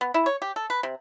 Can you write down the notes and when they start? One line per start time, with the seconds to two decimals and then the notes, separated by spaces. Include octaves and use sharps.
0.01 B3
0.14 E4
0.26 C#5
0.42 G4
0.56 A4
0.70 B4
0.83 C3